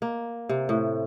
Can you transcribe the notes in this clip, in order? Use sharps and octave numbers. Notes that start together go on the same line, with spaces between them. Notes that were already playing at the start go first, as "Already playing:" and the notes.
A#3
C3
A2